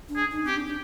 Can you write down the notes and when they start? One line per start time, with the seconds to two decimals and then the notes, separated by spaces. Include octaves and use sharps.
0.09 D4
0.16 G#4
0.31 D#4
0.45 C4 G4
0.54 D4
0.66 D4